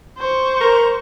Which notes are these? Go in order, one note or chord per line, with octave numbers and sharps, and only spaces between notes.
C5 C#6
A#4